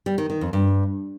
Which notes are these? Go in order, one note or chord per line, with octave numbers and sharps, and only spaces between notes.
G3
D#3
D#3
F2
G2